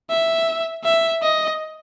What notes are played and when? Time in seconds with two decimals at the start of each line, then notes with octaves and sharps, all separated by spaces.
0.10 E5
0.84 E5
1.22 D#5